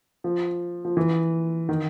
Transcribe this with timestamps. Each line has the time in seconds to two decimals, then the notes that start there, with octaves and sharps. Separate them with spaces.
0.24 F3
0.85 F3
0.97 E3
1.69 D#3